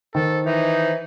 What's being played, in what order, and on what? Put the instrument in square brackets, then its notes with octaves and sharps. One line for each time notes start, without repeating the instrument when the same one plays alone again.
[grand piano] D#3 [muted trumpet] A4 [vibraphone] C5
[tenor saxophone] E3 [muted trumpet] D#4